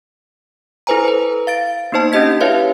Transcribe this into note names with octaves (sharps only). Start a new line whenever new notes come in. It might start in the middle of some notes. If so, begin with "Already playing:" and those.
E4 A4 B4 C5 G#5 A#5
B4 C5
F5 A6 D7
A#3 B3 D#4 C5 A5
C#4 D4 G4 D#5 G#6 B6
E4 G4 B4 C#5 E5 F5